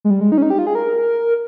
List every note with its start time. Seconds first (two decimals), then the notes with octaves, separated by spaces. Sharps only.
0.05 G#3
0.10 G3
0.21 G#3
0.32 D#4
0.38 C#4
0.42 D#4
0.50 G4
0.59 F4
0.67 G#4
0.75 A#4